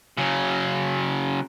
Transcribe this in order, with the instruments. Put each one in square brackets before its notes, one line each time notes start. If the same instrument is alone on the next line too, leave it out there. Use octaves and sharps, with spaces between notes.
[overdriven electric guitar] C#3 F#3